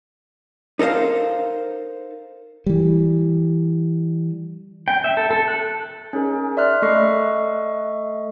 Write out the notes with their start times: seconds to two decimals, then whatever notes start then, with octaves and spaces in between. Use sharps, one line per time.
0.79 D#4 A4 A#4 C5 F5
2.66 E3 G3
4.88 G5
5.04 E5
5.17 A4
5.31 A4
5.48 F#6
6.13 C#4 D#4 G#4 A#4
6.57 D5 E5 C6 F6 F#6
6.82 A3 A4 D#5 E5 C#6 C7